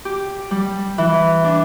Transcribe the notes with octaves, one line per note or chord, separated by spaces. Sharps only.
G4
G3
E3
D4